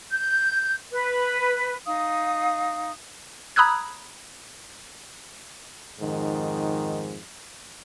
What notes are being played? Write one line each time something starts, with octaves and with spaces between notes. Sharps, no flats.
G6
B4
D#4 F5 D#6
A#5 B5 D#6 E6 F#6 G#6
F2 G#2 D#3